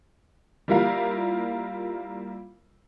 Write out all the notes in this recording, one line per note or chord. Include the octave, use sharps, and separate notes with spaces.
G3 A#3 E4 F4 A#4 F5